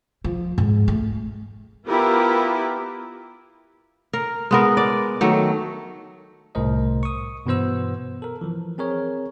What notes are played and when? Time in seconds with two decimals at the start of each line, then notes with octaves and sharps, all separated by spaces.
0.24 F3
0.58 G#2
0.88 A3
1.87 B3 E4 F4 G4 A#4 B4
4.13 A#4
4.51 G#3 B3 A#4
4.77 D5
5.21 D#3 F#3 A3
6.55 C2 A2 A#4 C5 D#5
7.03 C#6 D#6
7.46 G2 B2 E3 B3 C5 E6
8.22 A4 A#4
8.41 E3 F3
8.78 C4 G#4 A#4 C#5